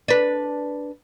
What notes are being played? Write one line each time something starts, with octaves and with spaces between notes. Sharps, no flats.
D4 B4